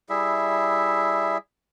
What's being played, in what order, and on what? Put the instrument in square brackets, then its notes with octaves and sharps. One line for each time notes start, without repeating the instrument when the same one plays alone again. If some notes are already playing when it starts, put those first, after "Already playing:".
[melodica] G3 E4 G#4 E5